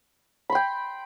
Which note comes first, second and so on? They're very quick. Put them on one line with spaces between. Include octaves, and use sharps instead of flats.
B5 C6 G5